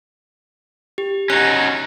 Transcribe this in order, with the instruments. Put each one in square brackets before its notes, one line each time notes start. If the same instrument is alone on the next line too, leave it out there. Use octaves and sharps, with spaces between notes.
[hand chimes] G4
[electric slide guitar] C#4 D#4 F#4 [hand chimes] F#6